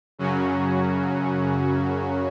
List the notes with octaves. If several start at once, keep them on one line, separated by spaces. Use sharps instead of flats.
F#2 C#3 F#3 C#4 F#4